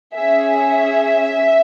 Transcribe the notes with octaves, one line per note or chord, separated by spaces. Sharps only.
C#4 G#4 E5